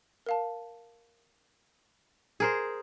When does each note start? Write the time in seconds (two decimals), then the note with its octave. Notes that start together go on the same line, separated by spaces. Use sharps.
0.26 A#4 F5 A5
2.40 G#4 A#4 C5